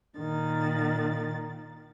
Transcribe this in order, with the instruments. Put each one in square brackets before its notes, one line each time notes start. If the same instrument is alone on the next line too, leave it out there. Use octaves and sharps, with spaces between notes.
[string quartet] A#2 D#3 A6